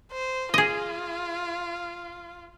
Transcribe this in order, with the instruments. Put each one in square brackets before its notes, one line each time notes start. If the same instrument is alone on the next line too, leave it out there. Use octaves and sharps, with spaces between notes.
[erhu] C5
[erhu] F4 [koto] G#4 D#5